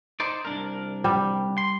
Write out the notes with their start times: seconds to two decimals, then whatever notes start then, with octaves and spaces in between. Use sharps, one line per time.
0.20 D#4 C5 D5
0.45 C2 D4 A#4
1.04 G3
1.58 C6